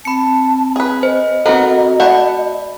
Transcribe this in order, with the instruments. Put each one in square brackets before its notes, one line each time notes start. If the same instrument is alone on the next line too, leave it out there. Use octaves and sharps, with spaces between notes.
[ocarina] C4 [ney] A5 [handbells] B5 C#7
[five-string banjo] G#4 B4
[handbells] C5 [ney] D#5
[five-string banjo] B3 D#4 A#4 [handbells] C4 A4 [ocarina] F#4
[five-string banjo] A3 F#5 [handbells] D5 B5